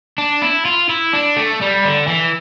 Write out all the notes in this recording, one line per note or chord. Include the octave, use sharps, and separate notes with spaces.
D4
E4
F4
E4
D4
A3
G3
D3
E3